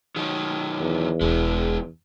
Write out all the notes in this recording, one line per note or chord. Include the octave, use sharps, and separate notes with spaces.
D#3 F#3
E2
E1 E3 G#3